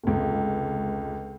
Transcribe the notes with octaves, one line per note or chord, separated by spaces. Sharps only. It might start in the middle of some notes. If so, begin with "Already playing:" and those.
F1 C#2